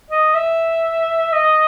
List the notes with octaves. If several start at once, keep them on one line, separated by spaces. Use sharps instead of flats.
D#5
E5
D#5